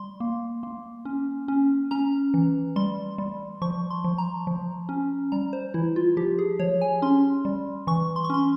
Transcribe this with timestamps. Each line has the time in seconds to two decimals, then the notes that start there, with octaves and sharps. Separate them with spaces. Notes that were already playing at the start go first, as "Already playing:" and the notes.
Already playing: G3 C6
0.20 A#3
0.63 A#3
1.05 C#4
1.48 C#4
1.91 C#4 A#5
2.34 E3
2.76 G3 C6
3.18 G3
3.62 F3 C#6
3.90 C6
4.04 F3
4.18 A#5
4.47 F3
4.89 C#4
5.32 G3 A#5
5.53 C5
5.74 E3 E4
5.96 F4
6.17 F3 G4
6.39 G#4
6.60 F3 C#5
6.82 G#5
7.02 C#4 C6
7.45 G3
7.87 E3 C#6
8.16 C6
8.24 C#6
8.30 C#4 C6